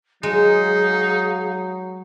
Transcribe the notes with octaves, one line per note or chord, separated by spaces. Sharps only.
F#3 G#3 D#4 G#4 F5